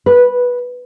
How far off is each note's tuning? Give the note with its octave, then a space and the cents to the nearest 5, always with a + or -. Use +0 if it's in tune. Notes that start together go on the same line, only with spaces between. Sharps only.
B4 -10